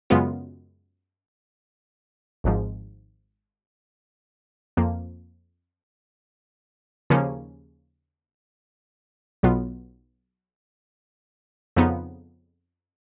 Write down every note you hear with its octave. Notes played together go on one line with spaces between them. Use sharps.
F#2 C#3 G#3 B3 F4
G#1 G#2 F3
F2 F3 A#3
D#2 C#3 F3 A#3 C#4
B1 B2 F#3 B3 F4
F2 C#3 F3 B3 D#4